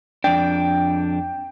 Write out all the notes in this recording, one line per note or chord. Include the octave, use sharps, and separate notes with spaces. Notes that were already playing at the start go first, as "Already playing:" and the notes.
F2 D4 G5